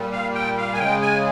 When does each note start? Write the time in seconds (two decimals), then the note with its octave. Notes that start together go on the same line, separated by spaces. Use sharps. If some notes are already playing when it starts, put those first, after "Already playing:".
Already playing: A#2 G3
0.12 F5
0.34 G5
0.57 F5
0.74 G#5
0.79 C#3 G#3 G5
1.02 G#5